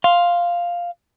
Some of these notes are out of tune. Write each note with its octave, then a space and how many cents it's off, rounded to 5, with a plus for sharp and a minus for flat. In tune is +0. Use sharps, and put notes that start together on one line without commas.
F5 +0 C6 +5